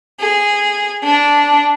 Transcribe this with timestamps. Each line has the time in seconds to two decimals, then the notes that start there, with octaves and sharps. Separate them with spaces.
0.20 G#4
1.04 D4